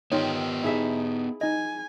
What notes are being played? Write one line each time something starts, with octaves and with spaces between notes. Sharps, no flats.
D#3 B3 F4 G4 C#5
D#4 E4 G#4 E5
D#4 D#5 G#5